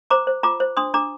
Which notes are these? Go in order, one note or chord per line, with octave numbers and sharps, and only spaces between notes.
C5 A#5 D6
C5
F4 A#5 D6
C5
D4 C6 D#6
D4 A#5 D6